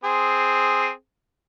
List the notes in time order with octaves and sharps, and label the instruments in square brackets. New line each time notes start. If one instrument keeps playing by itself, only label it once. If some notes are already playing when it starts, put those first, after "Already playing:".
[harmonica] C4 G#4